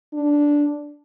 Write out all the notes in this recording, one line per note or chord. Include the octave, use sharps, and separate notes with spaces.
D4